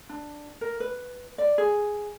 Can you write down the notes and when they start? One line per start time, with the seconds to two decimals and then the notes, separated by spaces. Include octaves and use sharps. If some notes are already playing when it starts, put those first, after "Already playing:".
0.09 D4
0.61 A#4
0.80 B4
1.38 D5
1.58 G#4